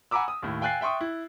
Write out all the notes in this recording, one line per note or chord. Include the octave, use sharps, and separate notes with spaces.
F#5 G#5 A#5 B5 D6 E6
D#6
D#2 A2
F5 G5 G#5 F#6 A6 C7
E5 G5 C6 C#6 D#6
E4